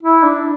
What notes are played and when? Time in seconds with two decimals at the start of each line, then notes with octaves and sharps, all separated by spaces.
0.03 E4
0.23 D4